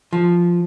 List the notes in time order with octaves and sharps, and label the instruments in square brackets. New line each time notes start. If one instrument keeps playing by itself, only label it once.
[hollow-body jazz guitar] F3